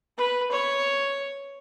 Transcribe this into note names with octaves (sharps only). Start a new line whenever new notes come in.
B4
C#5